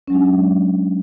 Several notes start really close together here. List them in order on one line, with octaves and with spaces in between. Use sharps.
C#4 F#3 G#3 D4